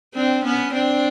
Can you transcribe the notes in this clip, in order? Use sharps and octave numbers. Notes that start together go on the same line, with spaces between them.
C4 D4
B3 C#4
C4 D4